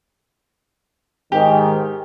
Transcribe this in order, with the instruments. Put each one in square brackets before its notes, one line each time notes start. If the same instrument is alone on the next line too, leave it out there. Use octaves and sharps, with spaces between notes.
[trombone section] G#2 D#3 [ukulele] G4